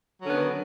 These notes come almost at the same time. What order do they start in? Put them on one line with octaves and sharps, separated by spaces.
F#3 D3 C#4 B3 D#3